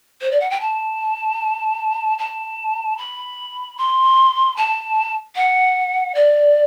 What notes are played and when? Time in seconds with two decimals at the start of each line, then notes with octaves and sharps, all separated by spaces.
0.21 C5
0.31 D5
0.40 F#5
0.50 G5
0.60 A5
2.19 A5
2.98 B5
3.78 C6
4.57 A5
5.36 F#5
6.15 D5